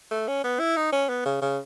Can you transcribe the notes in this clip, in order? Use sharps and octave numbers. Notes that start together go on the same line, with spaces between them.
A3
C#4
B3
E4
D#4
C#4
B3
C#3
C#3